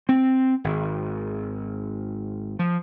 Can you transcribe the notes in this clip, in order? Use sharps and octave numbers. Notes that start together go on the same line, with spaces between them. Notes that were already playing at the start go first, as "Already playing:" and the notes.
C4
G#1
F3